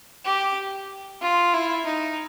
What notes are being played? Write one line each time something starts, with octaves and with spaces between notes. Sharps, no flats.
G4
F4
E4
D#4